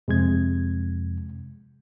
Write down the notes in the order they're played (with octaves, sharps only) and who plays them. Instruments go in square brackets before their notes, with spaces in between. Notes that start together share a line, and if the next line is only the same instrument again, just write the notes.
[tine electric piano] F2 [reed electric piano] C3 G#3 G#6